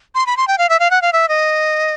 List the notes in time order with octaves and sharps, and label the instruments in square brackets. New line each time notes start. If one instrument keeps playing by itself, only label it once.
[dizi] C6
B5
C6
G5
F5
E5
F5
F#5
F5
E5
D#5